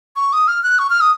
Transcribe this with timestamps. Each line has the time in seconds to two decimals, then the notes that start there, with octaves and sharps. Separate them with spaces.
0.16 C#6
0.33 D#6
0.48 F6
0.63 F#6
0.79 C#6
0.90 F6
1.01 D#6